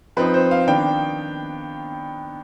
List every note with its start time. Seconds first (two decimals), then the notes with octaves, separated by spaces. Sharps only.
0.17 F3 C4 D#4 B4
0.34 C5
0.51 F5
0.68 D#3 B3 D4 G5